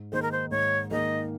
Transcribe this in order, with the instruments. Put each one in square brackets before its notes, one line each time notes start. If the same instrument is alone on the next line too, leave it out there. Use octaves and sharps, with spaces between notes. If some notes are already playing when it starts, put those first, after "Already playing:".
Already playing: [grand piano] G#2
[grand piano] D#3 A#3 D#4 G#4 [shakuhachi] C5
[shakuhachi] A#4
C5
[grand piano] G#2 [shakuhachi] C#5
[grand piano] D#3 A#3 D#4 G#4 [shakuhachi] D#5